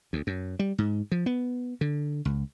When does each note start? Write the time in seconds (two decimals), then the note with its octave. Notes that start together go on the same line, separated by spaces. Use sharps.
0.13 D2
0.27 F#2
0.59 G3
0.78 G#2
1.12 F3
1.26 B3
1.81 D3
2.25 C#2